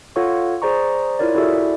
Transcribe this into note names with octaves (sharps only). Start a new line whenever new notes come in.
F4 A4 C#5 F5 F#5 C#6
G#4 C5 D5 A#5 C#6
E4 F4 A#4 C#5 D5
E4 F#4 G#4 A4 D5 E5